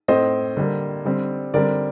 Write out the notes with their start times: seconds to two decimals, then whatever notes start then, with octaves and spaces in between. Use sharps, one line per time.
0.08 A2 A3 C4 C5 D#5
0.57 D3 G3 A#3
1.05 D3 G3 C4
1.54 D3 G3 C4 A#4 D5